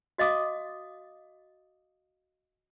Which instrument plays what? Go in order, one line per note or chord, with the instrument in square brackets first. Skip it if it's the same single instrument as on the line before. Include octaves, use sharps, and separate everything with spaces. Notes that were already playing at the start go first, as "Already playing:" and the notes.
[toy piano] F#4 D#5 F5 D6 D#6